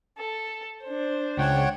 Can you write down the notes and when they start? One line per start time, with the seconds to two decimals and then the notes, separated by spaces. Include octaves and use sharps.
0.18 A4
0.84 D4 C5
1.38 C#2 C#5 F#5 G5